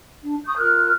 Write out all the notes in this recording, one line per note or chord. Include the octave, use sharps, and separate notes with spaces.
D4
C#6 D#6 G6
F4 A#4 F6 F#6